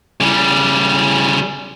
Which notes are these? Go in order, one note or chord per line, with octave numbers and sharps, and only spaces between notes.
C#3 G3